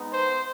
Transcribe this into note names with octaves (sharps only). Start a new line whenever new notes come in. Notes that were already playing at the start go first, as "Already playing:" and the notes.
Already playing: G#3 B3 D#4
C5